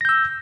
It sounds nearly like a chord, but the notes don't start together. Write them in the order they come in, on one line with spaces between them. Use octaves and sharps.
A#6 G6 E6